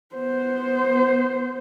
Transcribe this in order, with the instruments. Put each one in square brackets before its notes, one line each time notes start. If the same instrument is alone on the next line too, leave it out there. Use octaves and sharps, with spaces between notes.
[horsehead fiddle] B3 C5